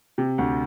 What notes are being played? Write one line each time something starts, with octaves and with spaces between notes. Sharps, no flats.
C3
D2